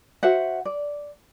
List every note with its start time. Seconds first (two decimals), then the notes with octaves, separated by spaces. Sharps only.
0.23 F#4 C5 E5 F#5
0.65 D5